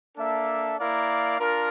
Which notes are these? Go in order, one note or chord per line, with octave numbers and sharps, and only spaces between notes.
A#3 D4 A4 E5
A#3 E4 A#4 D5 F5
D4 F4 A#4